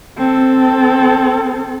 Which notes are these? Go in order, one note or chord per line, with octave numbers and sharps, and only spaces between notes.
C4 A4